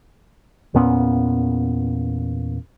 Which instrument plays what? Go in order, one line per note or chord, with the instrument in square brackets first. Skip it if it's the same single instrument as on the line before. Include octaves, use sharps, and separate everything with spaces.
[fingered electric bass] E2 A#2 B3 C#4